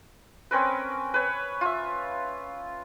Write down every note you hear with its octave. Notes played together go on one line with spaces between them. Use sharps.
C4 C#4 A#4 B4
B4 C#5
F4 E5